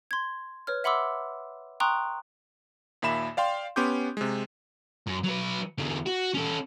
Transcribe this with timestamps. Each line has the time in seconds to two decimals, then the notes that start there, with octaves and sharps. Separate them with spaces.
0.11 C6 G#6
0.67 B4 C#5 F6
0.84 E5 F#5 B5 C6 D6 E6
1.80 G5 A#5 C6 C#6 D#6 F#6
3.02 D#2 A#2 E5 B5 E7
3.37 D5 F5 G5 C6
3.76 B3 C#4 G4 C6 D6 G6
4.17 C3 G#3
5.07 F#2
5.24 F#3 B4
5.78 E2 D3
6.06 F#4
6.34 C#4 A4